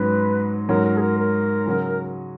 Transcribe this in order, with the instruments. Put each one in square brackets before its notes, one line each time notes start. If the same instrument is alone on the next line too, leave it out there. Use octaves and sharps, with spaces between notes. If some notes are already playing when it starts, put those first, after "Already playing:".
Already playing: [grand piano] G#2 F#3 C#4 [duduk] B4
[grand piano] G#2 F#3 C#4 F#4 C#5 [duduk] A#4
[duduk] A#4
G#4
A#4
A#4
[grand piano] C#3 F#3 C#4 F#4